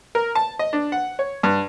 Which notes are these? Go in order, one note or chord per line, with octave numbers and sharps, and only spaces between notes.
A#4
A5
D#5
D4
F#5
C#5
G2